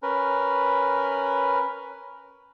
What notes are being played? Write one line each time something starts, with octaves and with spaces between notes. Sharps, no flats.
C#4 A#4 B4